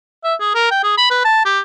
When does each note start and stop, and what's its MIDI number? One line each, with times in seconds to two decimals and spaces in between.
0.24 0.34 76
0.40 0.50 68
0.54 0.70 70
0.71 0.83 79
0.83 0.94 68
0.98 1.09 83
1.11 1.21 71
1.25 1.44 81
1.45 1.60 67